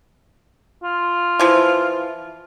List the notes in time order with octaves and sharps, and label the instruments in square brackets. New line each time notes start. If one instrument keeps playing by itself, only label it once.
[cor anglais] F4
[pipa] E3 F3